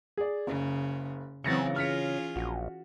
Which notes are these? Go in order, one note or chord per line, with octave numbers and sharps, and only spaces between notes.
G#4 D5
F#1 C#3
C#3 E3 F#3 C4 A6 A#6 C#7
C#4 F4 G#4 F6 B6 C#7
A#1 F#4